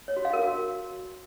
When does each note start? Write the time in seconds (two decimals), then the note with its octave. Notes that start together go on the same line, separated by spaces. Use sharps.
0.08 C#5
0.16 F#4
0.25 F5
0.33 A#4
0.42 F#4